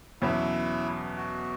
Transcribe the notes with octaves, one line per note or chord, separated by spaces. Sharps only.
E2 B2 F#3 C#4 E4
F#4